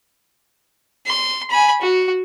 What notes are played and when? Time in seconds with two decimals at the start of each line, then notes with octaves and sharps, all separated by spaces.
1.07 C6
1.50 G#5 B5
1.82 F#4